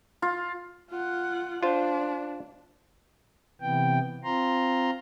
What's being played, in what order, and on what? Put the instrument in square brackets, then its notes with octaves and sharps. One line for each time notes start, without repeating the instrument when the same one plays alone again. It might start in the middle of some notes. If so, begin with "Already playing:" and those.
[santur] F4
[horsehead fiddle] F4 F#5
[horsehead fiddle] D4 [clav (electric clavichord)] F4 C5
[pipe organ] C3 E3 B3 G5
C4 F4 A#5 C6